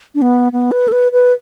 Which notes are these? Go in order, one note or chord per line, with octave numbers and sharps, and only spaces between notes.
D4
B3
B3
B4
A4
B4
B4